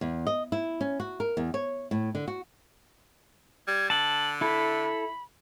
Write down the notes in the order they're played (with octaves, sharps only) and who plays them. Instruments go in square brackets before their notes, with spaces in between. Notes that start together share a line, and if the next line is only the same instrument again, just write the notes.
[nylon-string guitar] E2
D#5
E4
C#4
F#4
A#4
E2
C#5
A2
D3
F#4
[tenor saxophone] G3 [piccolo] G#6
[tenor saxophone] D3 [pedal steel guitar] A5 [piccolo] F#7
[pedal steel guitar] E4 A4 [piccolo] B5